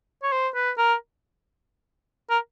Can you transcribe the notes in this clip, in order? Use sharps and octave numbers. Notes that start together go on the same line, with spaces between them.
C#5
C5
B4
A#4
A#4